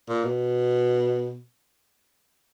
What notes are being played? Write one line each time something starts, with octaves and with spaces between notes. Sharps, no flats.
A#2
B2